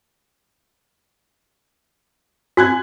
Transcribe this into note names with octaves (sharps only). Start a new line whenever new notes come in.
F#4 G#5 F#6 G#6